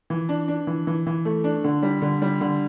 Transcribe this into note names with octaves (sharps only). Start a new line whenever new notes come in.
E3
D4
D4
E3
E3
E3
A3
D4
D3
G3
D3
G3
D3